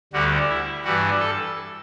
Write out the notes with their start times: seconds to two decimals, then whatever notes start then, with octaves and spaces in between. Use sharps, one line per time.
0.13 D2 D3 G3 F#4
0.49 E4
0.84 G2 E3 G3 F#4
1.20 A4